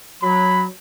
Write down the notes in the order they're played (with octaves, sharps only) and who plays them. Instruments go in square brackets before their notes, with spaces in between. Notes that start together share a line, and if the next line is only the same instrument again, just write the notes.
[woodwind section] F#3 [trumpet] B5